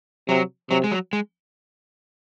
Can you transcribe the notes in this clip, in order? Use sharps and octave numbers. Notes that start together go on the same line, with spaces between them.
C3 F#3
C3 F#3
G#3
F#3
G#3